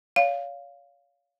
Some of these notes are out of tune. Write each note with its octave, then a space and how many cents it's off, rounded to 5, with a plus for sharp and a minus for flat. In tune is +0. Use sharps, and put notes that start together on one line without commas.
C#5 +35 F5 +0